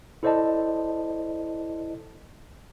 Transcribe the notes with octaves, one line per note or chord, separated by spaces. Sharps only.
E4 A4 C5 D5 D#5 A5